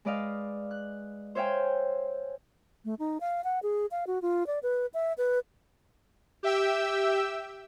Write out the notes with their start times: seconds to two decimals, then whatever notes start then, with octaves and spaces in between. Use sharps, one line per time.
0.05 G#3 B4 D5 D#5 F5
0.71 F#6
1.35 C5 C#5 E5 F5 G5 G#5
2.85 A3
2.99 D#4
3.21 F5
3.44 F#5
3.63 G#4
3.91 F5
4.07 F#4
4.22 F4
4.47 D5
4.63 B4
4.94 E5
5.18 B4
6.43 G4 E5 G5 E6